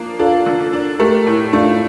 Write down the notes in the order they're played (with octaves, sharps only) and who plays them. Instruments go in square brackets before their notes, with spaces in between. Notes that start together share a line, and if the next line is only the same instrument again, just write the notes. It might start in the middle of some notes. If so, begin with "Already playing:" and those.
Already playing: [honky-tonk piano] F3 A#3 D4
[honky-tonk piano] D4 [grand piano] F4 A4
[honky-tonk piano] D3
D4
[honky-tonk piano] A3 [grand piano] G4 A#4
[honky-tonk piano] A2
[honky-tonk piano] A3 [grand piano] D4 F4